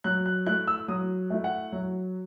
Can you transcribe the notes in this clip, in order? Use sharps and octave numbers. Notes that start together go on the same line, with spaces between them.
F#3 F#6
F#6
A3 E4 F#6
E6
F#3 D#6
A3 E4
F#5
F#3